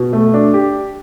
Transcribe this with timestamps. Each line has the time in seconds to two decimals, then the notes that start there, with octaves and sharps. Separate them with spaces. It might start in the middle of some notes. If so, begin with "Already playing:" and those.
Already playing: B2
0.13 A3
0.34 D4
0.54 G4